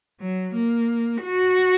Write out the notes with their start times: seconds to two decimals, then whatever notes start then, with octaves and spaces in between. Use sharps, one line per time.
0.21 F#3
0.55 A#3
1.23 F#4